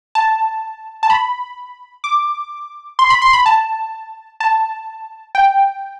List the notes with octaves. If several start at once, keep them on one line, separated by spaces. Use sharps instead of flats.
A5
A5
B5
D6
C6
B5
C6
B5
A5
A5
G5